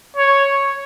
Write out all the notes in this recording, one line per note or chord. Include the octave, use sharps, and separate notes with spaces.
C#5